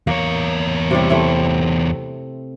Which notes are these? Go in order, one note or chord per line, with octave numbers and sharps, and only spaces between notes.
E2 A#3 C#5
C3 G3 E4
A3 C4 E4